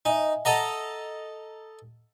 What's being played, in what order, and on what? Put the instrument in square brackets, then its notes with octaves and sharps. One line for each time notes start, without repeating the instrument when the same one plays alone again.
[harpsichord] D#4 [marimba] D#5 E5 G#5
[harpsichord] A4 D#5 A#5 [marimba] F#5